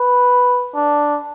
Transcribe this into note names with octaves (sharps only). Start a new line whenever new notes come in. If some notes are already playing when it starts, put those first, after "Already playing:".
Already playing: B4
D4